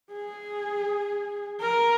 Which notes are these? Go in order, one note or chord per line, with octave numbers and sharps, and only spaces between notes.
G#4
A#4